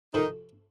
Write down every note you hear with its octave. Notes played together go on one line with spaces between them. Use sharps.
C3 D#3 F3 C4 D#4 F#4 A4